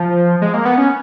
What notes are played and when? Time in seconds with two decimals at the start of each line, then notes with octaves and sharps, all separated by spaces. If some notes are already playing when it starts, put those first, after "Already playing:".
Already playing: F3
0.42 G#3
0.54 A#3
0.65 B3
0.78 C#4